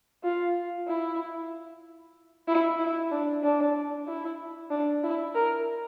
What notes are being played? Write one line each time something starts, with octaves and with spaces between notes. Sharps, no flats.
F4
E4
E4
E4
D4
D4
E4
D4
E4
A#4